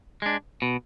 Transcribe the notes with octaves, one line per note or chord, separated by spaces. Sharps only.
G#3 D4
B2